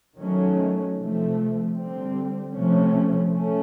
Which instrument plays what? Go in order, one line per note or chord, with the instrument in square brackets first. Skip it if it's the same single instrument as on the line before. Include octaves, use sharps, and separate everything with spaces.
[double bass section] D#3 F#3 A3 C#4
C3 F3 A3
D3 G3 C4
C3 F3 A3 C#4
A3 C#4